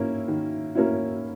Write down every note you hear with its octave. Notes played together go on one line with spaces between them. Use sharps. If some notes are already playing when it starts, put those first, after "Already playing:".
Already playing: A#3 C#4 E4
D#3
A#3 C#4 E4